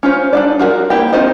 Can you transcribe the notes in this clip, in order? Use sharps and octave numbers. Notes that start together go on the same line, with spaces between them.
C#4 F4 C5
D4 D#4 D5
F4 F#4 G#4 A#4
A#3 E4 G4 G5
C4 D#4 F4 C5 D#5